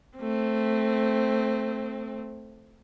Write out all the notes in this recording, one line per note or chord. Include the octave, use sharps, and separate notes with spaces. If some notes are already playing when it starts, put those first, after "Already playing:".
A3 C4